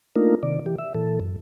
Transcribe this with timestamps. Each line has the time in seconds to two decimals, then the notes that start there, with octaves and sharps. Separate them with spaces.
0.16 A3 A#3 D4 D#4 F4 A#4
0.43 C3 D#3 D5
0.66 E3 G4
0.78 E5
0.95 A#2 E3 A4
1.20 F#2